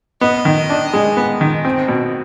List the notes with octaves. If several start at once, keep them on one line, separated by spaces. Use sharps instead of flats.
B3 D#5
D#3
D4
G#3
B3
D#3
C4
B2